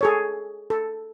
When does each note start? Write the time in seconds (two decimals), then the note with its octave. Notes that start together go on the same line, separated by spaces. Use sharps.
0.01 G#4 A4 C#5
0.70 A4